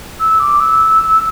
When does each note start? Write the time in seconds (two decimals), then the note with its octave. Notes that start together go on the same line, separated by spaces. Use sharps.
0.20 E6
0.39 D6
0.60 E6